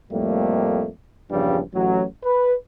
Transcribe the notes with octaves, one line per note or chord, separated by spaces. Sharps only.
F2 A2 G3 A3 A#3
A#1 E2 G2 C#3 F3 G3
A1 F#3
B4